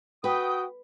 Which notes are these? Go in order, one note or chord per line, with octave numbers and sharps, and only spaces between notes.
F#4 B4 G5 D#6